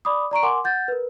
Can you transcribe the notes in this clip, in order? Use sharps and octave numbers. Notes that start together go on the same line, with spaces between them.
D5 B5 D6 D#6
D5 A#5 C#6 D7
A#4 F#5 G#5 C6 D6
F#5 G6 A6
A#4 B4